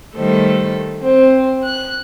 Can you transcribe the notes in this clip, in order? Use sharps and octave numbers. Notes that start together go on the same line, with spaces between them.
D#3 G3 A3 A4 C5
C4
F#6